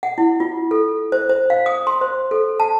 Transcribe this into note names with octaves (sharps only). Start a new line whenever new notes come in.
F#5
E4
F4
A4
C5
C5
F5
D#6
C6
C5
A4
A5